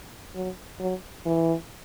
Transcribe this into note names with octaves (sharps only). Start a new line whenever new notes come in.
F#3
F#3
E3